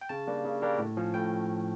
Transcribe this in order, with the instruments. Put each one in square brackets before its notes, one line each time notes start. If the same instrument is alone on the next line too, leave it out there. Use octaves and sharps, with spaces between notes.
[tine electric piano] G5
C#3 A5
G3 A#3 D4
C#3
G3 A#3 D4
A2
F3 C#4
A2 G5